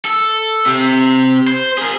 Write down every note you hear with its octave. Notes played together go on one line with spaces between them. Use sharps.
A4
C3
C5
G#4 A#4